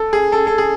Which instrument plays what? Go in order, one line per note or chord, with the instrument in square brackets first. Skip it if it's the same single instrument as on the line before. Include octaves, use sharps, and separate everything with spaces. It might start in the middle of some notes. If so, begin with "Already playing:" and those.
Already playing: [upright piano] A4
G#4
A4
A4
G#4